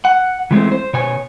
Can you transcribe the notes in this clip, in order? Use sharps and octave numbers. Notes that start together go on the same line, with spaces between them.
F#5
E3 G#3 A3 C4
C5
B2 C#5 G#5